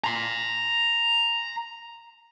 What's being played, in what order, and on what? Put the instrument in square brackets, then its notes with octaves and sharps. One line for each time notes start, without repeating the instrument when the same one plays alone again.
[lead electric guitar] A#5 C6